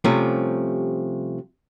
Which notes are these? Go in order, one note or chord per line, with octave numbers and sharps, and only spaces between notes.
C3 F3 G3 A3 C#4